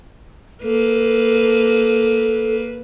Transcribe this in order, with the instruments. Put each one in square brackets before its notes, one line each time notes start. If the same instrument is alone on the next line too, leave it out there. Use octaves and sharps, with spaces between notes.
[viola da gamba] A#3 B4 [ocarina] A4